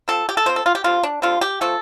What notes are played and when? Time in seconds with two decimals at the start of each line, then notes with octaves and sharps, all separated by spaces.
0.08 F3 C4 A4
0.29 G4
0.37 A4
0.46 F3 C4 C5
0.56 A4
0.66 F4
0.75 G4
0.84 D3 G3 C4 F4
1.03 D4
1.22 D3 G3 C4 F4
1.41 G4
1.61 F3 A3 C4 A4